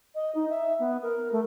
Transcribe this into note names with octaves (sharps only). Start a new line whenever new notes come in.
D#5
D#4
E5
B3
A#4
A3